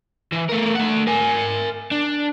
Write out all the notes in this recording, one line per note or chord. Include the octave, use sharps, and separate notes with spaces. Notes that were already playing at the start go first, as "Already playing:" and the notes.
E3
A3 A#4
A3 F#5
A#4 G#5
D4